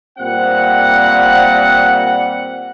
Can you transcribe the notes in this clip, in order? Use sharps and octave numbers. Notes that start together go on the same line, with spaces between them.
A#2 G3 C4 F#5